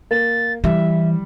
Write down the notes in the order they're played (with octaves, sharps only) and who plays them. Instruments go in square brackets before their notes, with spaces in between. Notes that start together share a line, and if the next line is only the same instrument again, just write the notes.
[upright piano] A#3 [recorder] A6
[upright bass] E3 [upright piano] G3 [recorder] E5